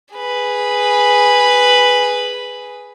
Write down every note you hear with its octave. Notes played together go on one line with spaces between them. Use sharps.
G#4 B4